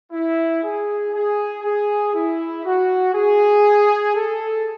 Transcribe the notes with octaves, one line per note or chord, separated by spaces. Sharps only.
E4
G#4
G#4
G#4
E4
F#4
G#4
A4